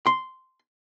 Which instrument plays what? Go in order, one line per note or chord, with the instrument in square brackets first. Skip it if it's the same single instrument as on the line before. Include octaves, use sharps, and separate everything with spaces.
[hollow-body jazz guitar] C6